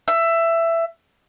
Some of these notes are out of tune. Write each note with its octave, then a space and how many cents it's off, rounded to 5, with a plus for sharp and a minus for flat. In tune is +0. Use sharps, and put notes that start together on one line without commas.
E5 +15